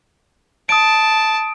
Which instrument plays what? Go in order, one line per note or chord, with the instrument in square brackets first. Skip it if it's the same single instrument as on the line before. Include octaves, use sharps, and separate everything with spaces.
[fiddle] A5 [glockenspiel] D#6 D7